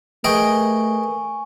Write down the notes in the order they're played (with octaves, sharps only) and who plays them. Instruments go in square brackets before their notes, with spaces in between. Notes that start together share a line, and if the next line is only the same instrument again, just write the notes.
[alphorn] A3 [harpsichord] G#4 D#5 G5 [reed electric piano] A#4 B4 [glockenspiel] G#5 C#6